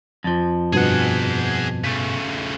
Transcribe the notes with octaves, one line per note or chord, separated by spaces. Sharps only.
F2 F3
G2 B2 B3 G#4 F#5
C#3 A3